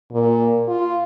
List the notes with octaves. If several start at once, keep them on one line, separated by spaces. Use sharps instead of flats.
A#2
F4